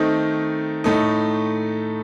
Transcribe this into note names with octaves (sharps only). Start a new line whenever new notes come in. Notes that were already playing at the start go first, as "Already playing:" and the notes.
Already playing: D#3 A3 C4 D#4
A2 A3 D#4